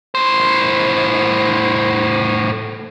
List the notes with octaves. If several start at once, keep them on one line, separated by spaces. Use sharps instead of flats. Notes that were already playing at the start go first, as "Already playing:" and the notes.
A2 C5